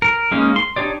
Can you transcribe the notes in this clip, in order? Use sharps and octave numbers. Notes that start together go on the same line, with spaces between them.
A#4
G#3 A#3 C#4 D#4
C6
D4 D#4 G4 C#5 D5